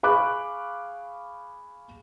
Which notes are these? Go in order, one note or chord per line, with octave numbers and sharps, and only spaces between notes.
G#4 F5 B5 C#6 D6 F#6